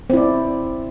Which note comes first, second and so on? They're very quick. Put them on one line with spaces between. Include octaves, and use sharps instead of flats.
C4 E4 D5